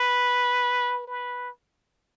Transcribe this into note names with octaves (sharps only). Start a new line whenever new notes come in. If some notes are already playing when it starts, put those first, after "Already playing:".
Already playing: B4
B4